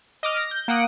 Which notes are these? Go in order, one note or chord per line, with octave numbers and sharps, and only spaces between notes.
D#5 D6 F6
A#6
G6
A#3 F#5 D#6 D7